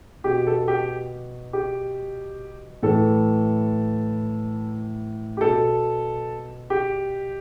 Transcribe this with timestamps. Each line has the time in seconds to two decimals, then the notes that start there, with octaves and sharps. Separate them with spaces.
0.24 B2 G4
0.47 A4
0.68 G4
1.53 G4
2.83 A2 E3 A4
5.37 G4
5.41 B2 A4
6.70 G4